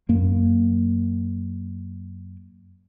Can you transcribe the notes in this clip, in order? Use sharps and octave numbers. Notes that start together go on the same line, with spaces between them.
F#2 A#3